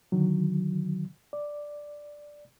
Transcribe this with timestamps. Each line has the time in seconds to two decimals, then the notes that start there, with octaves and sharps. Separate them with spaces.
0.12 D3 D#3 F#3
1.33 D5